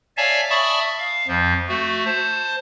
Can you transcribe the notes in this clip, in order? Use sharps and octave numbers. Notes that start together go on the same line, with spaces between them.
C#5 D5 E5 F5 G#5 A5
D5 E5 A5 B5 C#6 D#6
F5
F2 F3
A3 F#4
C5 A5